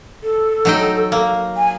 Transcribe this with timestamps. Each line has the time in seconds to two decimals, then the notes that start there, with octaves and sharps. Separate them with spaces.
0.24 A4
0.65 F#3 D#4 G5
1.12 A#3
1.57 G#5